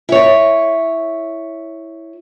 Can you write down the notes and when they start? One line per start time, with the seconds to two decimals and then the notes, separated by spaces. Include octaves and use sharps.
0.09 E4 C#5